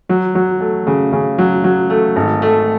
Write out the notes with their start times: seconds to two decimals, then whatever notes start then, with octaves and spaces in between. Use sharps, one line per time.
0.09 F#3
0.35 F#3
0.61 A3
0.87 C#3
1.12 C#3
1.38 F#3
1.64 F#3
1.90 A3
2.16 G#1
2.42 A3